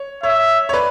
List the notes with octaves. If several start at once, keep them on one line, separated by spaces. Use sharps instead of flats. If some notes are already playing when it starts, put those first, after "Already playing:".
Already playing: C#5
C#5 E5
C#5
B4 D5